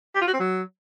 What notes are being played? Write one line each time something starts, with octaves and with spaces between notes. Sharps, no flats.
G4
F4
F#4
C4
F#3